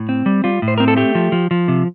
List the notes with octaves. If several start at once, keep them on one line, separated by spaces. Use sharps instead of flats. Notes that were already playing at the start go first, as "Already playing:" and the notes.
Already playing: A2
C4
G3
G3 F4
A2
C5
C4 A#4
A4
A3 G4
F3
F3
F3
C3